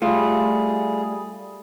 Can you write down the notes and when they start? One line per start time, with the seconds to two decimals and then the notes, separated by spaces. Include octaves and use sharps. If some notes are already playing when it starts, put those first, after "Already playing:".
0.02 G3 A3 F4 G#4